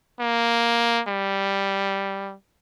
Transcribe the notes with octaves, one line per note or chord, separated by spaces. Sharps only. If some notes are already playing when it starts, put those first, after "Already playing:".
A#3
G3